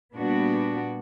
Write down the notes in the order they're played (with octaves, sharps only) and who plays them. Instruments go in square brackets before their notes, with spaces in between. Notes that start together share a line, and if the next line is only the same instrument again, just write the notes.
[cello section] A#2 G3 B3 D4 F#4